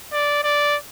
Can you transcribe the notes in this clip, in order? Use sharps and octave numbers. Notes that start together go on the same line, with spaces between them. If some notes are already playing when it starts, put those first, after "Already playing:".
D5
D5